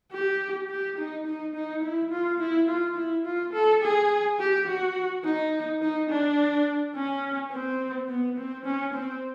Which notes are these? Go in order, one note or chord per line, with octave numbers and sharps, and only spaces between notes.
G4
G4
D#4
D#4
D#4
E4
F4
E4
F4
E4
F4
A4
G#4
G4
F#4
D#4
D#4
D4
C#4
C4
B3
C4
C#4
C4